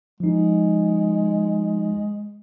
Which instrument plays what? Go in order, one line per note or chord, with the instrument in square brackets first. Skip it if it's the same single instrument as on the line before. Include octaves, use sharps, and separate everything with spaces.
[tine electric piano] F3 D#4 [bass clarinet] G#3